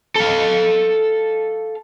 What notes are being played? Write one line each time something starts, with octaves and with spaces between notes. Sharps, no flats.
A4 F5